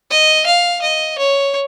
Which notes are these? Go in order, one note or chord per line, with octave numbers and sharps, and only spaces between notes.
D#5
F5
D#5
C#5